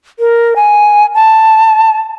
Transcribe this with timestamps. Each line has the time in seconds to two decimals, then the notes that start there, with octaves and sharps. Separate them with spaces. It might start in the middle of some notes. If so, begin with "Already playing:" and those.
0.19 A#4
0.56 G#5
1.15 A5